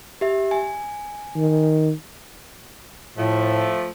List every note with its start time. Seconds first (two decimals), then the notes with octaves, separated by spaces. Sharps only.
0.21 G4 E5
0.51 G#5
1.36 D#3
3.17 A2 F3 A3